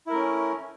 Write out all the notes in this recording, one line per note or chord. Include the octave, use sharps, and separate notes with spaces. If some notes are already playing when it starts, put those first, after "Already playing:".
A3 C#4 E4 A#4